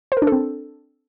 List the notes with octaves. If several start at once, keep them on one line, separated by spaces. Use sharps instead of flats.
C5
A#4
D4
A4
C4